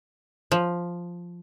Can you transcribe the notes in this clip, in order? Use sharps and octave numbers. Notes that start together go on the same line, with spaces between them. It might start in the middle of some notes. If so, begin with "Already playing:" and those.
F3